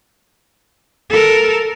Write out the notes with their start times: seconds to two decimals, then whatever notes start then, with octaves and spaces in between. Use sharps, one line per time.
1.10 A4 A#4